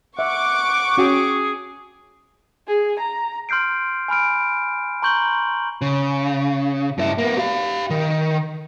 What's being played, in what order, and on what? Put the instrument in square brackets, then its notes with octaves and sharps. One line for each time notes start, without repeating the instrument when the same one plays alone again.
[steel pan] E5 [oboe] F#5 [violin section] C#6 D6
[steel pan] C#4 F#4 G5 [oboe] G#4
[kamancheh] G#4
A#5
[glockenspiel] C6 F6 G6 C7 D7
G#5 B5 F6 D7
A#5 C6 C#6 G6 F#7 G7
[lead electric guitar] C#3
G2 E4
A#3 B3
G4 F5
D#3